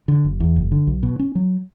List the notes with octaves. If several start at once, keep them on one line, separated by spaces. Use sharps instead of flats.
D3
F#1
E2
F#1
D3
B1
B2
C#4
F#3